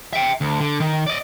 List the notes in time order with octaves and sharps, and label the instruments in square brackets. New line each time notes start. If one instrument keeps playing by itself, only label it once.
[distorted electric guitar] E5 G5
D2
D3
D#3
D5 D#5